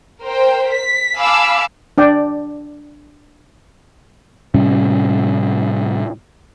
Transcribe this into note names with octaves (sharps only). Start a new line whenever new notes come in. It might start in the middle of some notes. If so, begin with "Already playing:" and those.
A#4 C5 G5
B6
F5 G#5 A5 B5 D6 E6
D4 D5 G5
A2 C3 G3 C#4